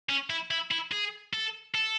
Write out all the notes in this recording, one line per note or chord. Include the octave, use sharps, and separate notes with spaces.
C#4
E4
E4
E4
G#4
A4
A4